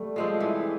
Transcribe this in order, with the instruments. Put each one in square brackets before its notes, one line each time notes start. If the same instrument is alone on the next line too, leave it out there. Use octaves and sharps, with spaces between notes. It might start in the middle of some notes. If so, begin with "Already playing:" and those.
Already playing: [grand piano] G3 A3
[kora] F3 G#3 C4
E3